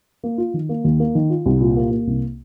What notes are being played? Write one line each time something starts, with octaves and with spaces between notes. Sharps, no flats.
A#3
F4
D#3
A#3
D#2
A#3
D#3
F4
C2
A#2
A#3
A#3
C2